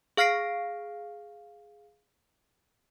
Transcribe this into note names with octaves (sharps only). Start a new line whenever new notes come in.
G#4 F5 F6 A#6 C7 D7